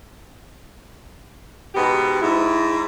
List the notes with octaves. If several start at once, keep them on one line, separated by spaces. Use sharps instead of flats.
G#2 B2 B3 G4
G#2 E4